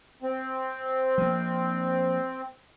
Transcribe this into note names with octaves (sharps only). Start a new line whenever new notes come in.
C4
F3 A#3